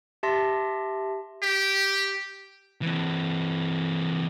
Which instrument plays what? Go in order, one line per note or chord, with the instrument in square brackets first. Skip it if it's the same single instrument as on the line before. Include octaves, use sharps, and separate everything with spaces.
[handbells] G4 E5 A5 C6 A#6
[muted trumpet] G4
[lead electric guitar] E3 C4